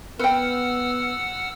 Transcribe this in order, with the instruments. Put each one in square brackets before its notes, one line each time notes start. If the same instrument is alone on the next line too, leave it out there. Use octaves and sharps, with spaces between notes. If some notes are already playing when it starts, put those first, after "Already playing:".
[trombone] B3 [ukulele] B4 G5 [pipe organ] F#5 E6 F6